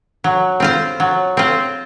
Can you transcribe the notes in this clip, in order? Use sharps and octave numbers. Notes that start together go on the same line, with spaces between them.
F#3
C4 F4 C5
F#3
C4 F4 C5